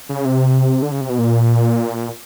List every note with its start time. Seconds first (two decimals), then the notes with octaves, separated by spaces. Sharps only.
0.09 C#3
0.25 C3
0.82 D3
0.91 C#3
1.01 C3
1.09 B2
1.19 A#2